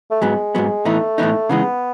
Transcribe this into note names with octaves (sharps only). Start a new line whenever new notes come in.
A3
G#2 F#3 G#3 B3
G#2 F#3 B3
A2 E3 A3 B3 D#4
A2 E3 B3 D#4
C#3 E3 G#3 B3 D#4